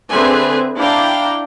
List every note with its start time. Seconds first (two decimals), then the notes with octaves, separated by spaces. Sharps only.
0.11 D3 C4 G#4 B4 E5 G#5
0.79 D4 E4 F5 G5 A#5